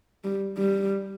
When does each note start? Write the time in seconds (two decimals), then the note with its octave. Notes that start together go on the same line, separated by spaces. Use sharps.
0.24 G3
0.57 G3